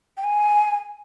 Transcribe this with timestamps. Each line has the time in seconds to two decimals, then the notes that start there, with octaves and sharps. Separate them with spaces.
0.17 G5
0.24 G#5